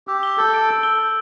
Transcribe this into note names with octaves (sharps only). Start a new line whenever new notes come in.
G4 E6
G7
A4 G6
D7
E6
G7
G6